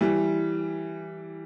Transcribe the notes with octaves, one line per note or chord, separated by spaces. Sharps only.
E3 G3